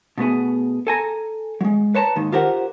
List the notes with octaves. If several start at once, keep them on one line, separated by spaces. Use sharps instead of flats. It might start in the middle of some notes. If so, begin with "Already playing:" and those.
B2 A3 B3 G#4
A4 G#5 A#5
F#3 G#3
B4 C#5 A5 A#5
D#2 G#2 D#3
F4 G4 A#4 C5 F#5